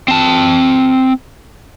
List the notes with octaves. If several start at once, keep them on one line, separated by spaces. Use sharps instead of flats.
C4 A5